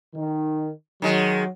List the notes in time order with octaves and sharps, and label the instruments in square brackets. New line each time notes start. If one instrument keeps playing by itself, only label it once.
[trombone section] D#3
[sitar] D#3 G#3 [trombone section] F#3